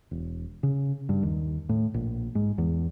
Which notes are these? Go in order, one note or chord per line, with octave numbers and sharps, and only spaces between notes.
E1
C#3
G2
D#2
A2
A#1
G#2
E2